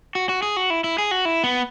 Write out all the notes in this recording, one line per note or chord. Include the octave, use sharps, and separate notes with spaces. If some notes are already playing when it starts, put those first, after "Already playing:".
F#4
F#4
G#4
F#4
E4
E4
G#4
F#4
E4
B3